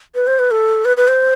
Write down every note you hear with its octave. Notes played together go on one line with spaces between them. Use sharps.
B4
C5
B4
A4
B4
B4
C5